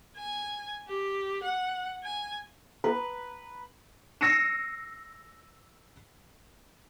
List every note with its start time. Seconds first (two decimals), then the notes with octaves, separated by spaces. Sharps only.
0.17 G#5
0.88 G4
1.43 F#5
2.04 G#5
2.84 B4
4.21 E6 A#6 C7 C#7 D#7 E7